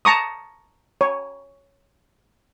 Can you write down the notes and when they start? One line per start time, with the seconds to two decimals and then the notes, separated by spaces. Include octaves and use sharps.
0.05 A5 A#5 C#6 D#6
1.01 C#5